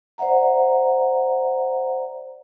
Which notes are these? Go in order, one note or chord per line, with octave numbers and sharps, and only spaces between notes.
C5 D5 E5 F#5 A#5